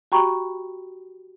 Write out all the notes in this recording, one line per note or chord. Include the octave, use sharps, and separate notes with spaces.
F#4 G4 G5 A#5 B5 C#6